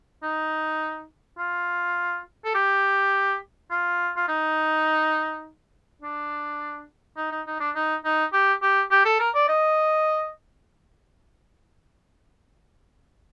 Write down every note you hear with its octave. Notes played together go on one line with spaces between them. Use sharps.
D#4
F4
A4
G4
F4
F4
D#4
D4
D#4
D#4
D#4
D4
D#4
D#4
G4
G4
G4
A4
A#4
D5
D#5